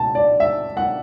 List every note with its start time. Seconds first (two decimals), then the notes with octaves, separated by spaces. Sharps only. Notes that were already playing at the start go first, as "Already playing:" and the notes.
Already playing: C#2 B2 A5
0.15 D5
0.40 E5
0.77 F#5